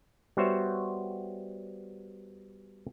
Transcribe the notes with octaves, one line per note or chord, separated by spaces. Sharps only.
G3 B3 F#4 C5 C#5 E5